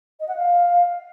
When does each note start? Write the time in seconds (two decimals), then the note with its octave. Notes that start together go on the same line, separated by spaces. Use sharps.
0.20 D#5
0.28 F#5
0.36 F5